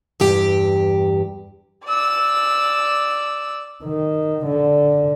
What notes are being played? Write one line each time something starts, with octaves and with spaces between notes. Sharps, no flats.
E2 G2 G4 G5
D5 E6
D#3
D3